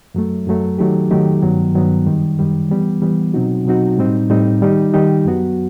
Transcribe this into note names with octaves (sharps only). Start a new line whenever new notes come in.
F#2 F#3 A3
F#2 F#3 A3
D#3 F#3 A3 D#4 G4
D#3 F#3 A3 D#4 G4
G2 D#3 F#3 B3
G2 D#3 F#3 B3
F#2 D#3 G3
F#2 D#3 G3
E3 G3 B3
E3 G3 B3
B2 F#3 C4 D#4 F#4
B2 F#3 C4 D#4 F#4
A2 G3 C4 D#4
A2 G3 C4 D#4
D#3 G3 D#4 G4
D#3 G3 D#4 G4
F#2 F#3 B3 F#4